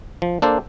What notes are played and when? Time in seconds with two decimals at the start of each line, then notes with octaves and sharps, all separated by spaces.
0.22 F3
0.42 A#3 D4 A4 C5